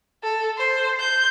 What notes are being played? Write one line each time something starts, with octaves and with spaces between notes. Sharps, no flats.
A4
C5
G6